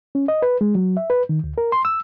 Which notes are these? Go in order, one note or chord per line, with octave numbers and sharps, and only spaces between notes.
C#4
D#5
B4
G#3
F#3
E5
B4
D#3
D2
A#4
C6
E6